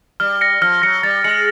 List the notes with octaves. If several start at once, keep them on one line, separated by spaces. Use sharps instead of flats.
G3 F6
A#6 C#7
F3 F6
F#3 A#6 C#7
G3 A6
G#3 C#7 F#7